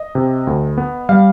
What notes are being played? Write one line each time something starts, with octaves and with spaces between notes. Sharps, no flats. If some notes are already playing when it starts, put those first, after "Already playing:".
Already playing: D#5
C3
D2
B3
G3 F5